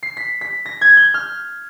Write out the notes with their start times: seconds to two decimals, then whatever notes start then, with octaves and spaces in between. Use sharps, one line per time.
0.03 C7
0.17 B6
0.41 B6
0.66 A#6
0.81 G#6
0.97 G6
1.14 F6